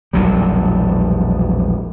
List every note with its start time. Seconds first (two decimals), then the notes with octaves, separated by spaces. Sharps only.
0.13 E1 A#1 F#3 G3